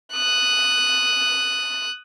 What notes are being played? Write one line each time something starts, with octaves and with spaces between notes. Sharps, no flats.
D#6 F#6